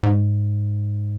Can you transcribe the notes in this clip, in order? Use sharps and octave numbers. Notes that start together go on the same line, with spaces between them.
G#2